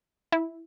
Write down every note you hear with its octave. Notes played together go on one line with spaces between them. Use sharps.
E4